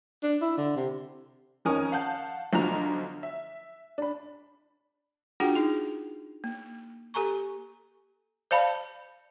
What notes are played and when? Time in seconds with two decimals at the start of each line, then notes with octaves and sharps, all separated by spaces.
0.23 D4
0.42 E4
0.57 D3
0.77 C3
1.65 F2 D#3 C#4 A#4 G#5 D#6
1.92 F5 F#5 A5 G6
2.53 B1 D3 F3 F#4 A#5 F7
3.23 E5
3.98 D4 B5
5.40 D4 F4 F#4 G#4 F#5 G5
5.56 D#4 G#4
6.44 A#3
7.14 G4 A4 G#5 A#5 C#6
8.51 C5 D5 F5 A5 B5